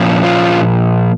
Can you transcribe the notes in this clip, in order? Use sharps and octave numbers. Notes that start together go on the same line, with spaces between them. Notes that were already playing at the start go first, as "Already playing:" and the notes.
Already playing: A#2 F3 A#3 C#4
F4